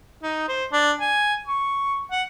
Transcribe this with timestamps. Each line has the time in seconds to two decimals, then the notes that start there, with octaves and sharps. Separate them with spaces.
0.23 D#4
0.48 C5
0.72 D4
1.00 G#5
1.47 C#6
2.11 F#5